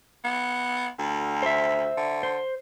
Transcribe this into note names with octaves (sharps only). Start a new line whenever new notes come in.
B3
D2
C5 E5
D3
C5